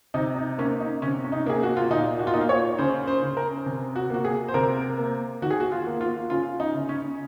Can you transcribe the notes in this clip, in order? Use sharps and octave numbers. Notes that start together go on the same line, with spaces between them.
C3 D#4
D#4
A#3 C#4
D#4
C3 C#4
C#4
D#4
A#3 G#4
F#4
F4
A#2 D#4
F#4
F4
A#3 D#4
F4
C#5
C#3 C5
C5
C#3
A#4
C3
F#4
A#3 F#4
G#4
C5
C3 A#4
A#3
D#3 F#4
G#4
F#4
F4
A#3
F4
C#3 F4
D#4
C#3
C#4